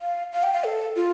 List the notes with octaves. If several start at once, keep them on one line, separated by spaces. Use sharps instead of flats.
F5
F5
G5
F5
A4
F4